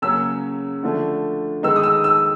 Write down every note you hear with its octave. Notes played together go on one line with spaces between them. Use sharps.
C#3 F#3 A#3 C#4 E6
D3 F3 A3 D4
D#3 G#3 B3 D#4 E6
D#6
E6
E6